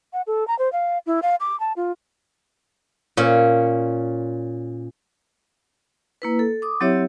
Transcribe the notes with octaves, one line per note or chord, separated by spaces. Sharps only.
F#5
A4
A#5
C5
F5
E4
F5
D6
A5
F4
A#2 C#4
A#3 E4 B4
A4
D6 D#6
F#3 C4 E4 G4 C#5 E5